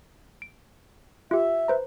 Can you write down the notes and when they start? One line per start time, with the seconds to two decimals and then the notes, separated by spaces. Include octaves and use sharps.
0.42 D7
1.31 F4 G4 E5
1.68 B4 C5 A#5